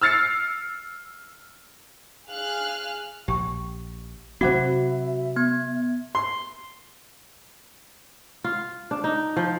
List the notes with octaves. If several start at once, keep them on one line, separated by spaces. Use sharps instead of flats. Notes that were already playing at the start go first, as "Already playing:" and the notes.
E6 F6 A6 C7 C#7
G#4 F5 F6 F#6
A#1 G4 C#6
C3 F#3 C4 F#4 C5 E5 F#5 D6
B3 G#6
C6
F4
D4
D#4
F3